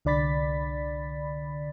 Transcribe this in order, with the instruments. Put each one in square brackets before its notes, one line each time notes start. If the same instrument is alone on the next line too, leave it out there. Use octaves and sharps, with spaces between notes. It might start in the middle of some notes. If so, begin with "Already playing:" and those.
[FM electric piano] C2 D3 D5 B5 A6 B6